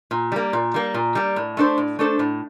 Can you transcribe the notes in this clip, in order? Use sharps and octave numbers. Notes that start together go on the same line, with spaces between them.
A#2
G3 A#3
A#2
G3 A#3
A#2
G3 A#3
A2
A3 D4 A4 C5
A2
A3 D4 A4 C5
A2